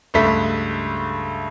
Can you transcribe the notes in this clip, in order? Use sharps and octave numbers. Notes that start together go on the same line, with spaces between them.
C#2 G2 A3 B6